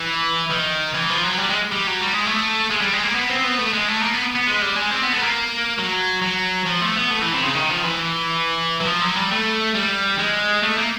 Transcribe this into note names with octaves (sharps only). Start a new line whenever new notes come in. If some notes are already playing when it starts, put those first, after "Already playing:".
Already playing: E3
D#3
E3
F3
F#3
G3
G#3
G3
F#3
G3
G#3
A3
G#3
G3
G#3
A#3
B3
C4
B3
A3
G#3
A3
A#3
B3
B3
G#3
G3
G#3
C4
B3
A3
B3
A#3
F#3
F#3
F3
A3
B3
A3
E3
C3
C#3
D#3
F3
E3
F#3
F3
F#3
G3
A3
G3
G#3
A3
A#3